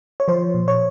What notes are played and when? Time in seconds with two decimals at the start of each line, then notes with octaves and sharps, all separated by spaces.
0.20 C#5
0.28 F3 C5
0.54 A#2
0.68 C#5